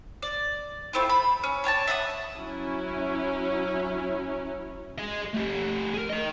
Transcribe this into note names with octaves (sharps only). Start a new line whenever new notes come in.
D5
A3 C4 E4 F4
B5
C#4
D4 C#5 G#5 A5
E5 F#5 B5 D#6
F#3 C#4 E4
G#4 D#5
A3 G4
G#4 A#4
A#4 D#5